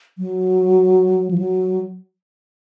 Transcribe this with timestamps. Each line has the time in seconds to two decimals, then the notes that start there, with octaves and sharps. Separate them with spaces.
0.18 F#3
1.31 F3
1.38 F#3